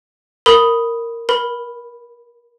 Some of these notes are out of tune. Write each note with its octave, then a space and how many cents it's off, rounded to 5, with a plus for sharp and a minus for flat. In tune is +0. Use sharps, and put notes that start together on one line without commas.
A#4 -10 B5 +0 D#6 +0
A#4 +30 B5 +0